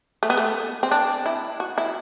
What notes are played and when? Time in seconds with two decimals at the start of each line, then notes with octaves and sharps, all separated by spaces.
0.23 A3
0.30 B3
0.37 A3
0.83 C4
0.91 D4
1.26 E4
1.60 F#4
1.78 E4